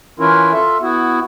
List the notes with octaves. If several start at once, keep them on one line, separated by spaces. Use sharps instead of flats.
E3 C#4 E4 F4 A#4
F4 A4 E5
B3 E4 F#4